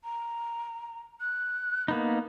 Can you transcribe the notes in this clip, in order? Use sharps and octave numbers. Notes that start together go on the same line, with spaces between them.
A#5
F#6
A#3 B3 D#4 B5